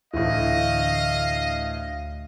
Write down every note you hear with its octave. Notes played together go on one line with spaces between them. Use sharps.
D2 A2 E3 D#5 F5